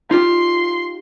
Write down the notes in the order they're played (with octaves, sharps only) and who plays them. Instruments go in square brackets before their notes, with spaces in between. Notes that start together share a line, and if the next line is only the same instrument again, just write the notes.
[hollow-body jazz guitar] D#4 F4 G4 [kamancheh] C6